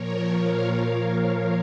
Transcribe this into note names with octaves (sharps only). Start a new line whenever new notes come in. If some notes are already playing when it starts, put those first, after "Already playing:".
Already playing: A#2 F3 A#4 C#5
C#5 F5